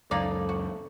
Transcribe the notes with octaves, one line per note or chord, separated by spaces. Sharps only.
C#2 F#2 A#3 D#4 A4 D5
F#4